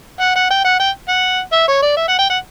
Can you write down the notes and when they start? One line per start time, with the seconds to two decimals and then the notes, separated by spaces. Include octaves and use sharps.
0.21 F#5
0.36 F#5
0.51 G5
0.64 F#5
0.79 G5
1.09 F#5
1.53 E5
1.68 C#5
1.83 D5
1.97 E5
2.08 F#5
2.19 G5
2.30 F#5